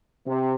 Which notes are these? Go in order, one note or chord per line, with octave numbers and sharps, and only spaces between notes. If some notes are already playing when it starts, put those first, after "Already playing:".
C3